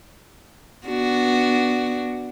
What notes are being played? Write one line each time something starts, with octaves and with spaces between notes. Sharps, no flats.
B3 D4 F#4